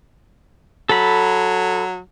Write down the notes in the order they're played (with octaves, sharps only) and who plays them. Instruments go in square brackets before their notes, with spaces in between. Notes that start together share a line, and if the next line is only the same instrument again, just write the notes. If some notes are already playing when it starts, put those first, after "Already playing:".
[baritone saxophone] F#3 [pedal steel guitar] A4 B5